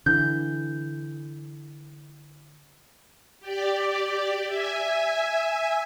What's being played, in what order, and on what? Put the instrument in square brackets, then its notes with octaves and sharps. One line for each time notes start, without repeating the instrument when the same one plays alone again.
[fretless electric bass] D3 E3 [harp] G6
[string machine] G4 D5
E5 G#5